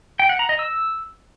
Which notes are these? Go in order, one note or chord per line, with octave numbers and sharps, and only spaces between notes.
G5
F#5
A#5
D#5
E6